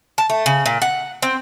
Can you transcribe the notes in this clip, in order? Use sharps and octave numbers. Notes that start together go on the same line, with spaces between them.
A5
A3
C#3
A#2
F#5
C4